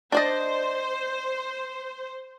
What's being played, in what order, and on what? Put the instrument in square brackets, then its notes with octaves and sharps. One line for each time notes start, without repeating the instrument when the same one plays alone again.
[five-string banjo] D4 D5 D#5 [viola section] C5